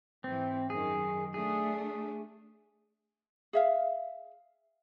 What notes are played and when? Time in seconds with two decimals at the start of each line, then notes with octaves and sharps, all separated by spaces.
0.24 G#2 E3 C4
0.70 F#2 D#3 G#4
1.34 A3 D4 G#4
3.53 G#4 E5 F5